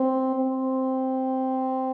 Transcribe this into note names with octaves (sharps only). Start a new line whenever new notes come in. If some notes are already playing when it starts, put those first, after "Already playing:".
Already playing: C4
C4